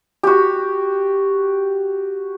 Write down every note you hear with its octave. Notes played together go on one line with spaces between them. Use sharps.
F#4 G4